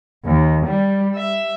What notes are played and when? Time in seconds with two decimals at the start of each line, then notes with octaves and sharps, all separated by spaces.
0.24 D#2
0.64 G3
1.17 E5